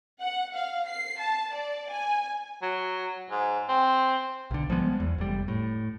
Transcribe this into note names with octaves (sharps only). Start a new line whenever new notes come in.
F#5
F5
C7
A5
D5
G#5
F#3
G#2
C4
B1 D3
F3 G3 G#3 B3
E2
F1 G3
A2